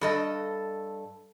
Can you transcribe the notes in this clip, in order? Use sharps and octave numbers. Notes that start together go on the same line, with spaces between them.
G2 A4 D#5